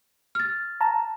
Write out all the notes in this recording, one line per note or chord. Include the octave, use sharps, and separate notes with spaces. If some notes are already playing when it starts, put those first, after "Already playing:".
F6 A6
A5 A#5